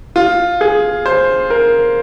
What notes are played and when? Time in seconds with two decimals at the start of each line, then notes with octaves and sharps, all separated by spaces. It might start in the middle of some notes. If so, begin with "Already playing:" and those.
0.16 F4
0.61 G#4
1.06 C5
1.50 A#4